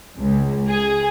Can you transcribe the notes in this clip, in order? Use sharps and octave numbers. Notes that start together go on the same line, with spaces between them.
C#2
G#4